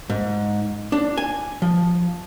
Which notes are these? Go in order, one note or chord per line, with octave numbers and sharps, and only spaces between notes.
G#2
D4
G#5
F3